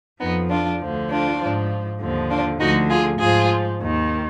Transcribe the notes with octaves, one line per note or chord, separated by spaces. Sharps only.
F2 F3 B3 D#4
D4 F4
D2 D3 F3
D4 F4
G#2 F3
D#2 D3 F3
D4 F4
D2 D3 F3 D#4 F#4
F4 G#4
G#2 F3 F4 G#4
D#2 D#3